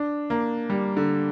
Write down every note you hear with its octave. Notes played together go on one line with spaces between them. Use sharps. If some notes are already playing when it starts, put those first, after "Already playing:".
Already playing: D4
A#3
G3
D3